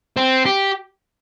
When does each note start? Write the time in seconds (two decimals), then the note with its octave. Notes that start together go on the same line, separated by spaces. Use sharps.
0.17 C4
0.46 G4